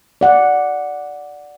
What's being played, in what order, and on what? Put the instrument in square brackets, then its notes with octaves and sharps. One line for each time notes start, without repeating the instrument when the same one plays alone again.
[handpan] D5 F#5